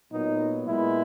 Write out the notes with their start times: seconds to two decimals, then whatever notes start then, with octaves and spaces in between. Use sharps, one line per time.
0.11 A#2 F#3 B3 D#4
0.67 A#2 G#3 B3 E4